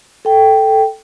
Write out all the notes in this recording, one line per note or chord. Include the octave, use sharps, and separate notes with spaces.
A4 G5